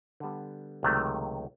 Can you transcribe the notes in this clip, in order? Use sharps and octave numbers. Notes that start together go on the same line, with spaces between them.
D3 G3 B3
C#2 C3 D#3 F#3 A3